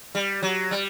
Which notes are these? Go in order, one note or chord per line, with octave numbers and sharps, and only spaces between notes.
G3
F#3
G3